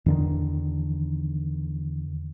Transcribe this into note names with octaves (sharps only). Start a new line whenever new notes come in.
E2 D3 D#3